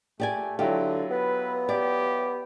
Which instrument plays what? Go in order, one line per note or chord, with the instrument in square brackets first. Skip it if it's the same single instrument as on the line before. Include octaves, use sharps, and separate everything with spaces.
[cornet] A3 [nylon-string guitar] G4 D5 G#5
[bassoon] D3 [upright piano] F#3 E4 F4 [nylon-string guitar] G4
[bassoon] B3 [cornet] B4
[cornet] G4 [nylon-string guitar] D5